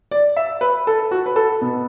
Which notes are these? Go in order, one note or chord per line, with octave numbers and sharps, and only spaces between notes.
D5
E5
B4
A4
F#4
B4
A4
B2 B3